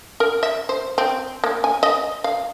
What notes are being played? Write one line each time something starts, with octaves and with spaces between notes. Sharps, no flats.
A#4
E5
C5
C4
A#3
G#5
D#5
F5